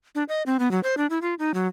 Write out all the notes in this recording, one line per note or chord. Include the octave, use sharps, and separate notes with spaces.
D4
D#5
C4
B3
F#3
C5
D4
E4
F4
D#4
F#3